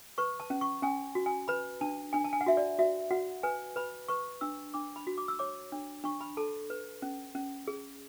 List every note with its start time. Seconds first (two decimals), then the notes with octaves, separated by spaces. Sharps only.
0.18 B4 C#6
0.40 A5
0.50 C#4
0.61 C#6
0.82 C#4 G#5
1.15 F#4
1.26 G#5
1.48 B4 B5
1.81 D4 A5
2.13 D4 G#5
2.25 A5
2.33 G#5
2.41 F#5
2.46 F#4 E5
2.57 D5
2.79 F#4 E5
3.10 F#4 F#5
3.43 B4 G#5
3.76 B4 B5
4.08 B4 C#6
4.41 D4 E6
4.74 D4 D6
4.96 B5
5.07 F#4
5.18 D6
5.28 E6
5.39 C#5 D6
5.72 D4
6.04 D4 C#6
6.21 B5
6.37 A4 A5
6.70 B4
7.02 C#4
7.35 C#4
7.68 G#4